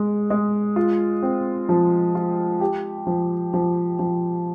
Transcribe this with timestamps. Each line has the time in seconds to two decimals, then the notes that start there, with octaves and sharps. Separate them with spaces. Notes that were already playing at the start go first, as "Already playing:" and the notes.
Already playing: G#3
0.30 G#3
0.76 F4
1.23 C4
1.69 F3
2.15 F4
2.60 G4
3.07 F3
3.54 F3
3.99 F3